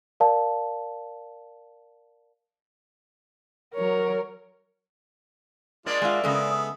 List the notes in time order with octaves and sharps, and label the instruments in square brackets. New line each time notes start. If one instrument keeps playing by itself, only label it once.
[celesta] A#4 D5 F5 A5
[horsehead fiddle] F#3 C#5 [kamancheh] A#4
[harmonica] G#3 D4 F4 [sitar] A#3 D5
[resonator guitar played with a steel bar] G#3 F4 [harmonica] D4 F#5 [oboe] E5
[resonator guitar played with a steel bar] C#3 G#3 A4 [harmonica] B3 G#4